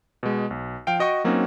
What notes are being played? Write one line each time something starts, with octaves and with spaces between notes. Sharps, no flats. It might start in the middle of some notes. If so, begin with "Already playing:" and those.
B2 G#3
B1
F3 F5 G5 D7
F#4 D#5 G5 C#6 D#6
F#3 A#3 C4 C#4 D#4 F#4